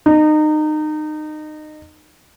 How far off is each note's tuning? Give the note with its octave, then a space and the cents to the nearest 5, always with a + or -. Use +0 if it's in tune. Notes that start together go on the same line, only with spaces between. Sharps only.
D#4 -25